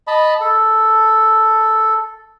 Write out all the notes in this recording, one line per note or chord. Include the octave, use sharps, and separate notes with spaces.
D#5 A5 B5
A4